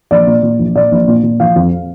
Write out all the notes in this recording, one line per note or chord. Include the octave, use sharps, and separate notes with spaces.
A#1 D5
A#2
A#2
A#1
A#2 D5
A#1
A#2
A#2
F3 F5
F2